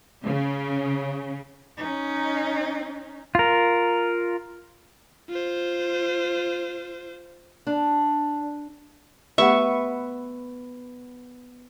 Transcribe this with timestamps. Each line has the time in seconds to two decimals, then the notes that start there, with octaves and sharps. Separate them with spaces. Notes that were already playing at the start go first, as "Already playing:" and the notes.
0.25 C#3
1.77 C#4 D#4
3.35 F4 A#4
5.29 F4 C5
7.67 D4
9.38 A3 B3 G4 B4 E5 F#5 C#6